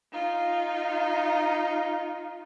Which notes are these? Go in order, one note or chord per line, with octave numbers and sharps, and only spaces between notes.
D#4 F4